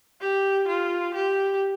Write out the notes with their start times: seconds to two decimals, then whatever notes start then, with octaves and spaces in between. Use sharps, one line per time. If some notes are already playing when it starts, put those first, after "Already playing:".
0.21 G4
0.68 F4
1.15 G4